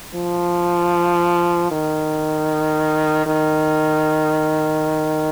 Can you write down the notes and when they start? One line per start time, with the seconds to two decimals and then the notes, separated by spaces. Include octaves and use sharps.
0.15 F3
1.71 D#3
3.26 D#3